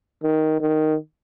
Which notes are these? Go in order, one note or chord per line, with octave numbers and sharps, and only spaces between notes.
D#3
D#3